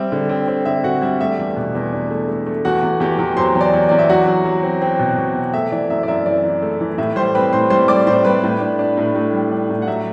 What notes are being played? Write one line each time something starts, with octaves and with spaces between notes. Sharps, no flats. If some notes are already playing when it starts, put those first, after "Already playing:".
Already playing: G3 C4 E5
D3
C4
C4
D3 E5
D3 F#4 F#5
G3 E5
A3 E5
E2
B2
E2
D4
A3
A3
A3
E2 F#4 F#5
E2
E2 G4 G5
E2
F#3 C5 C6
E2
D5
E2
E2 D5
E5
F#3 F#4 F#5
F#3
F#3
C4
C4
B2
B2
C4
A3 E5
E3 D5
F#2 E5
D5
F#2 E5
E3 D5
E3
A3
E3
A2 E5
G3 C5 C6
C4 B4 B5
A2 C5 C6
G3 C5 C6
G3 D5 D6
A2 C5 C6
G3 B4 B5
A2
D4
D4
A2
A2
G3
D4
A2
F#5
F#3 E5